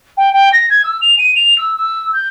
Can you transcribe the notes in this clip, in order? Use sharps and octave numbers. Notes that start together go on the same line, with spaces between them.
G5
G5
A#6
G#6
E6
F7
D#7
F7
E6
E6
G6